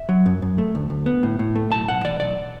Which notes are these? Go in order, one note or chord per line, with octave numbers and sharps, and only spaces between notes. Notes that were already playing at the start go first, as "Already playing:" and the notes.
Already playing: E5
F#3
F#2
F#2
A3
D2
D2
B3
A2
A2
A3
B1 A5
B1 F#5
E3 D5
B1 D5